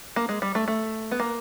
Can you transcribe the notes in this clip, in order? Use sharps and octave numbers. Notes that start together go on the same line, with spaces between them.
A#3
G#3
G3
A3
A3
B3
A#3